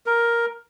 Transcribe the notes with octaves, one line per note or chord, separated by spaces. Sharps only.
A#4